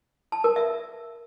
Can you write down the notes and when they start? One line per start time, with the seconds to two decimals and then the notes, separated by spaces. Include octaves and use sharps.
0.32 A5
0.44 A#4
0.56 E5